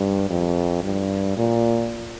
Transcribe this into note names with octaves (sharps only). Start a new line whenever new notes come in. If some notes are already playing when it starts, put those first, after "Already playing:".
Already playing: G2
F2
G2
A#2